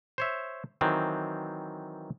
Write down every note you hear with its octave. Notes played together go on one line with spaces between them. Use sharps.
C5 C#5 E5
D#3 E3 F#3 C4